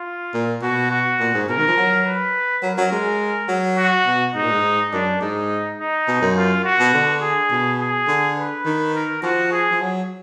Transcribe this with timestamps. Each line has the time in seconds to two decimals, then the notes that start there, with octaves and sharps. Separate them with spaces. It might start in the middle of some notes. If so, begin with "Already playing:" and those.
Already playing: F4
0.34 A#2
0.62 B2 F#4
0.90 F#4
1.20 A#2
1.34 G#2
1.48 B2 A#4
1.58 D#3
1.68 F3
1.77 F#3
2.05 B4
2.62 F#3 A#4
2.78 F#3
2.92 G#3
3.49 F#3
3.78 F#4
4.06 B2
4.35 G#2 D#4
4.43 A#2
4.51 G#2
4.93 F#2 D4
5.21 G#2 D#4
5.79 D#4
6.08 B2
6.22 F#2
6.36 F4
6.65 F#4
6.79 B2
6.94 D3
7.22 G#4
7.51 B2
7.80 G#4
8.08 D3
8.38 B4
8.65 D#3
8.94 A#4
9.23 F3 F#4
9.52 G#4
9.71 F3
9.81 F#3